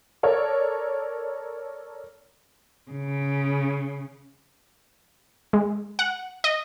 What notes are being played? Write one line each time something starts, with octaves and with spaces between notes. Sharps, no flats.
A4 A#4 C#5 D5
C#3
G#3
F#5
D#5